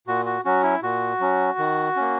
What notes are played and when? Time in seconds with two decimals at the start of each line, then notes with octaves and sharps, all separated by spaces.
0.08 A#2 F#4
0.25 F#4
0.45 F#3 C#4 F#4
0.63 E4
0.83 A#2 F#4
1.20 F#3 C#4
1.58 D#3
1.96 A#3 C#4